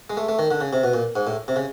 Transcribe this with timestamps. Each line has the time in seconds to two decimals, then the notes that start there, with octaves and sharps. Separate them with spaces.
0.10 G#3
0.17 A3
0.29 A3
0.39 D#3
0.51 D3
0.61 C#3
0.73 C3
0.84 B2
0.94 A#2
1.16 G#2
1.27 A2
1.48 C3
1.56 C#3